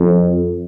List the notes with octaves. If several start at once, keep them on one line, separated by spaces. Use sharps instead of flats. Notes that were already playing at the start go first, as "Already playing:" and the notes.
Already playing: F2